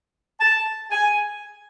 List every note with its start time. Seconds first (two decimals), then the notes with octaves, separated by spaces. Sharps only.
0.40 A5
0.91 G#5